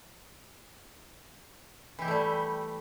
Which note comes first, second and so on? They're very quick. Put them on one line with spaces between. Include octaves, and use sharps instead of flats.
E3 G4 E4 A3 G3